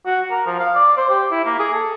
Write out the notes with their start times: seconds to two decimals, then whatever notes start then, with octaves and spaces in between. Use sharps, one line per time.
0.06 F#4
0.31 A#4
0.46 F3
0.59 F5
0.75 D5
0.97 C5
1.09 G4
1.31 E4
1.45 A#3
1.59 G#4
1.74 A4